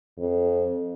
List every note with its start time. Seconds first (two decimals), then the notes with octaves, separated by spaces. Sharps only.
0.18 F2